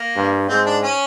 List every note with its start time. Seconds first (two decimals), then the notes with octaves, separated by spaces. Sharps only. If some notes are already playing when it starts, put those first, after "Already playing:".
Already playing: A#3
0.16 G2
0.49 G#2 C4
0.66 D4
0.83 C#4